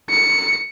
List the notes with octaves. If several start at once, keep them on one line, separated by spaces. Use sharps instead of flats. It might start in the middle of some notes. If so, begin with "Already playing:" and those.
C#7